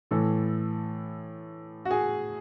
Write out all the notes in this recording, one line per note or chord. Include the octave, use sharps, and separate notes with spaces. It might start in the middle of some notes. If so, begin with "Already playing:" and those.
A2 E3 A4
F#4
G#4